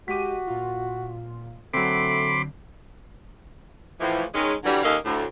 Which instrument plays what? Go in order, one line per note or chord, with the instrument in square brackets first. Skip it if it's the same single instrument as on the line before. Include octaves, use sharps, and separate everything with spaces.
[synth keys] G#3 G4 D#7 [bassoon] F#4 [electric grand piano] D6 B6
[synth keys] A#2 F4
[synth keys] D3 [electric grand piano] F#3 C4 [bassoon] A3 [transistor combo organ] B5 C6 D6
[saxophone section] A2 E3 F3
D#3 G#3 C#4
D3 E3 F#3 G3
D#2 A#3 C#4 A4 D#5 F5
D2 A2